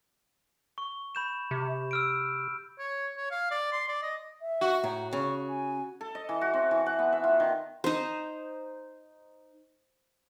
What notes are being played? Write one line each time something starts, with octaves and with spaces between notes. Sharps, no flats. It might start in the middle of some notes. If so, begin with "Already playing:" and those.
C#6
B5 G6 E7
C3
E6 F6 D7
C#5
C#5
F5
D5
C6
D5
D#5
E5
F#4
A2 A#5
C#3 C#6
G#5
A4
D#5
E3
F#4
C4
E3
F#5
B3
E5
F4
D#3
D#4 C5